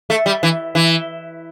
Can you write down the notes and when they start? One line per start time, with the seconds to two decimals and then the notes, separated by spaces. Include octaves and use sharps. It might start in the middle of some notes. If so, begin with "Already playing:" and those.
0.10 A3
0.26 G3
0.43 E3
0.75 E3